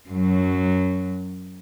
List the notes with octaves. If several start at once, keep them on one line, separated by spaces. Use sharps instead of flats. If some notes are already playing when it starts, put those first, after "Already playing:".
F#2 F#3